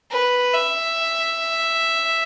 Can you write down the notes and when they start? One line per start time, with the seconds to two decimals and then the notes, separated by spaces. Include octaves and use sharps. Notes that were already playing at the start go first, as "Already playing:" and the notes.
0.12 B4
0.54 E5